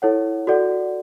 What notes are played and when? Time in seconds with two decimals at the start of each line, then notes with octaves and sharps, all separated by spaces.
0.02 E4 A4 C#5 F#5
0.47 F#4 A4 D5 F#5